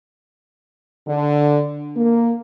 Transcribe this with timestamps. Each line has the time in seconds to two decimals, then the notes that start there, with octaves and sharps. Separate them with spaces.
1.07 D3
1.96 A#3